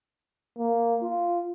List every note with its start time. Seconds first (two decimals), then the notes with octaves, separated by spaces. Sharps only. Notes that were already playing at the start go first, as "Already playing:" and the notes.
0.58 A#3
1.03 F4